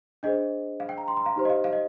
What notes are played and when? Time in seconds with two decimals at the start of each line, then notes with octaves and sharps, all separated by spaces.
0.23 D4 G#4 C5 D#5
0.80 F5
0.89 G5
0.98 A#5
1.08 C6
1.17 A#5
1.26 F5
1.36 D#4 G4 C5
1.45 D#5
1.50 F5
1.64 F5
1.73 D#5